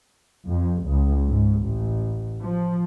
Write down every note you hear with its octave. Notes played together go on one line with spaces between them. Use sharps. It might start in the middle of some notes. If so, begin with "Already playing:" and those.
F2
C#2
G#2
A1
F3